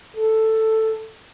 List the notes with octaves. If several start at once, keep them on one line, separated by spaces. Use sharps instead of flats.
A4